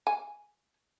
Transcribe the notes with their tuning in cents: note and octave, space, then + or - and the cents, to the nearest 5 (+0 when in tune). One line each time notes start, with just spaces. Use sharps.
G#5 +5